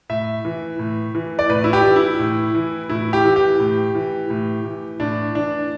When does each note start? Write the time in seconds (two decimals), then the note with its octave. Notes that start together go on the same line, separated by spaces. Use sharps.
0.09 A2 E5
0.45 E3
0.79 A2
1.15 E3
1.39 D5
1.49 A2 B4
1.64 E4
1.73 G4
1.85 E3
1.96 E4
2.19 A2
2.55 E3
2.89 A2 E4
3.13 G4
3.24 E3
3.36 G4
3.60 A2
3.95 E3
4.30 A2
4.65 E3
5.00 A2 D4
5.35 E3 D4